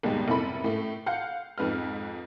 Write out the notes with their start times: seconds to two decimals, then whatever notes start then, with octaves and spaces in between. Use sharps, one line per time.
0.03 G#1 D#2 G#2 B2 G3 G#3
0.28 F1 C3 E4 A4 B5
0.64 A2 A3
1.06 F5 F#5 G6 C#7
1.58 F2 G#2 B4 F6